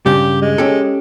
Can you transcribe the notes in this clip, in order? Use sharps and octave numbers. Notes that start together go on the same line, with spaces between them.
G2 C#3 G4
G#3
C#4 G4 A4